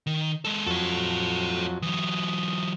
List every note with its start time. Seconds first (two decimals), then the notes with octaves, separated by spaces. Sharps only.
0.07 D#3
0.45 G#3 A4
0.66 F2 F#3 A4 C#5
1.82 E3 F#3 D#6